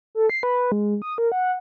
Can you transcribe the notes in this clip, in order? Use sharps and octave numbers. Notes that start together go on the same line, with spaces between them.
A4
C7
B4
G#3
D#6
A#4
F#5